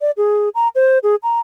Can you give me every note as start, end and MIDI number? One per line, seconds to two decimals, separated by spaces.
0.01 0.11 74
0.17 0.49 68
0.55 0.68 82
0.75 0.99 72
1.03 1.16 68
1.23 1.40 82